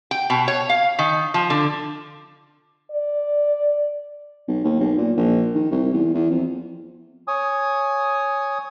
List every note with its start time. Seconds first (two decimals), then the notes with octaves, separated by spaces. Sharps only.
0.11 G5
0.30 B2
0.48 C#5
0.69 F5
0.99 D#3
1.34 F3
1.50 D3
2.91 D5
4.48 B1
4.64 D#2
4.79 B1
4.97 A#2
5.17 A#1
5.55 D#3
5.71 C2
5.93 E2
6.14 E2
6.30 F2
7.28 C#5 G#5 D#6